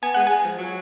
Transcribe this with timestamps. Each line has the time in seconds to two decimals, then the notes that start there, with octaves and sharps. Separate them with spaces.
0.03 B3 G#5
0.14 G#3 F#5
0.27 G#3 G#5
0.44 F3
0.58 F#3